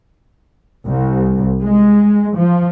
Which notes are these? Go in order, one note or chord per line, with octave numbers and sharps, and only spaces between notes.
C2
G#3
F3